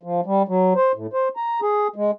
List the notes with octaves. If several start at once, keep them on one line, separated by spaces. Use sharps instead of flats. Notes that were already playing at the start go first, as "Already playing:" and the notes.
F3
G3
F#3
C5
A2
C5
A#5
G#4
G#3